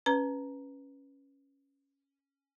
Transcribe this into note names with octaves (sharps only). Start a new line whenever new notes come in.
C#4 B4 A#5